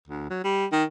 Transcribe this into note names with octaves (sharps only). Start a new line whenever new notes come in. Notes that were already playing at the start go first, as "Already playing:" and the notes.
D2
F#3
G3
D#3